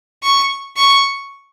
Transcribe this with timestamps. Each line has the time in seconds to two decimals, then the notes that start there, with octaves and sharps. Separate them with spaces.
0.23 C#6
0.77 C#6